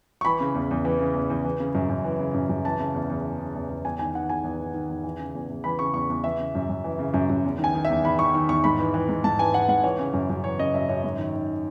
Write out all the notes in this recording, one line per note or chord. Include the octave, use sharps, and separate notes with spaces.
C#6
E3 B5
C#3
E2
E2
E3
C#3
E2
E2
E3
C#3
F#2
F#2
E3
C#3
F#2
F#2
E3 A5
C#3
E2
E2
E3
C#3
E2
E2
E2 G#5
D#3 G#5
D#3 F#5
E2 G#5
E2
D#3
D#3
E2
E3
C#3
E2
E2
E3 B5
C#3 C#6
E2 C#6
E2
E3 E5
C#3
F#2
F#2
E3
C#3
F#2
F#2
E2
D#3 G#5
D#3
E5
E2
E2 B5
D#3 C#6
D#3
E2 C#6
G#2 B5
E3
E3
G#2
G#2 A5
E3 G#5
E3 F#5
G#2 F#5
E3 C#5
C#3
F#2
F#2
E3 C#5
C#3 D#5
F#2 E5
F#2 C#5
G#2
D#3
D#3